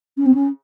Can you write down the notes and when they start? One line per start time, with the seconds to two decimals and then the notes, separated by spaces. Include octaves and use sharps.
0.17 C#4
0.25 C4
0.34 C#4